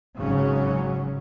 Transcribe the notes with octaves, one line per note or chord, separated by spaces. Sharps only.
G#1 C#3 F#3 C#4